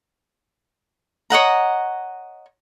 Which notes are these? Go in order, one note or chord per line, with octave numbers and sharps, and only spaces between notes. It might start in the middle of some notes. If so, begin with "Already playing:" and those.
C#5 D#5 F#5 A#5